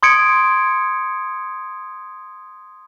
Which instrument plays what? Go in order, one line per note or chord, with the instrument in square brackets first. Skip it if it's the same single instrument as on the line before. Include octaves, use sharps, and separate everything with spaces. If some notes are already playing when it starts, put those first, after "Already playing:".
[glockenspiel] C6 D#6 G#6 C#7 D7